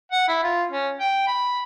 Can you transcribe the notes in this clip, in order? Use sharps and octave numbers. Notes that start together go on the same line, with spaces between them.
F#5
E4
F4
C#4
G5
B5